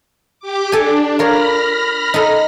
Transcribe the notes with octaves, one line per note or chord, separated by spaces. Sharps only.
G4 D6
D4 A4 G#5
F4 A#4 C#5 B5 F6 A#6
D#4 A4